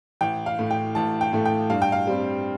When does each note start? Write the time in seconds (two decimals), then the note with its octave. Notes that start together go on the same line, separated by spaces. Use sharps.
0.21 A1 G5
0.46 F5
0.58 A2 A3
0.71 G5
0.95 A1 A5
1.21 G5
1.33 A2 A3
1.45 G5
1.70 G2 F5
1.82 G5
1.92 F5
2.07 G3 C4